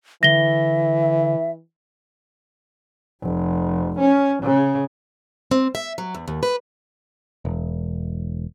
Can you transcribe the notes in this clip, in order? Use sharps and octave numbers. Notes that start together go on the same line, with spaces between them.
D3 E3 E5 A#6 G7
F1
C#4
C#3
C4
E5
F#3
E2
D#2
B4
E1